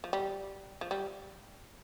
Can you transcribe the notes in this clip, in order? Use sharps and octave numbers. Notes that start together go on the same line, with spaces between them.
F3
G3
F3
G3